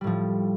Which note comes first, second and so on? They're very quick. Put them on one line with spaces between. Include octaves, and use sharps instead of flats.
G3 A2 F3